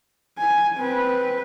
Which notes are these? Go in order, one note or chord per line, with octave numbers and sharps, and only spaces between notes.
G#5
C4 B4